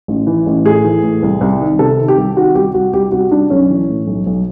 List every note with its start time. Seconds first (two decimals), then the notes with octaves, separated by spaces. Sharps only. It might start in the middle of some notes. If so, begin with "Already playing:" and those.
0.08 A1
0.27 E3
0.46 A1
0.65 A2 G#4
0.84 E3
1.03 A2
1.22 C2
1.41 C2
1.61 D#3
1.79 C3 A4
1.99 D#3
2.08 G4
2.18 C2
2.36 D#3 F#4
2.55 C2 G4
2.74 C2 F#4
2.93 C2 G4
3.12 C2 F#4
3.31 C2 D4
3.50 B1 C#4
3.70 E3
3.89 A2
4.07 B1
4.26 B1